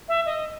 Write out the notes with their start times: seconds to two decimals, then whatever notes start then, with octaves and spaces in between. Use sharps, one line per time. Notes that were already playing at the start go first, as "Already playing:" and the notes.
0.08 E5
0.26 D#5